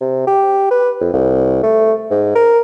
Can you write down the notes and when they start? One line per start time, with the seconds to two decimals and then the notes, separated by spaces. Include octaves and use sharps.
0.01 C3
0.27 G4
0.71 B4
1.01 F2
1.13 C2
1.63 A3
2.11 G#2
2.35 A#4